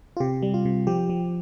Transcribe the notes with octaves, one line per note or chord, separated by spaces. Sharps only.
F4
C3 G4
G3
F4
C3
F3 G4
F3